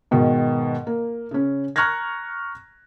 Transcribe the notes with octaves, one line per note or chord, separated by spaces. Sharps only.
G#2 B2 D#3
A#3
C#3 C#4
A#5 C#6 F6 F#6 G#6 A#6